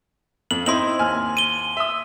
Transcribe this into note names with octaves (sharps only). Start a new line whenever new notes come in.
F2 F#7
C4 D#4 E4 C6 F#7
D#2 G#5 F6
D#7 G7
E5 D#6